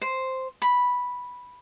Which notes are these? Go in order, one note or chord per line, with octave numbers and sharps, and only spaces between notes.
C5
B5